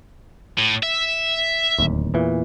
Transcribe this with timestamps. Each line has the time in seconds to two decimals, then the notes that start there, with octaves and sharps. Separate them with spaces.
0.58 A2
0.83 E5
1.78 D1 D#2
2.14 E2 A#2 E3